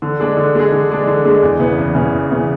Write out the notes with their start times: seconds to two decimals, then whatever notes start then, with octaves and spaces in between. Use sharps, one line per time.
0.02 D3
0.20 G#3 D4 G#4
0.37 D3
0.55 G#3 D4 G#4
0.72 D3
0.90 G#3 D4 G#4
1.07 D3
1.25 G#3 D4 G#4
1.43 E2
1.60 C#3 E3 B3
1.78 E2
1.95 C#3 E3 B3
2.12 E2
2.30 C#3 E3 B3